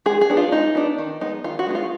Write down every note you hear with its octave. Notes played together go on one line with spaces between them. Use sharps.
G#3 G#4
G#4
B3 D4
F4
G#3 D#4
B3 D4
D#3
G#3 B3 D#4
D#3 F4
F#4
G#3 B3 D#4
F4